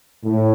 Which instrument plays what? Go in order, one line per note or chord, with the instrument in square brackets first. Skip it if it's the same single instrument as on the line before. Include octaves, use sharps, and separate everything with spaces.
[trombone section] A2